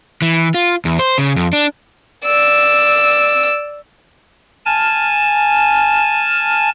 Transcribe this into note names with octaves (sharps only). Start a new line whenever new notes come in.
E3
F4
E2
C5
C#3
F2
D4
D5 E6
G#5 A5 F6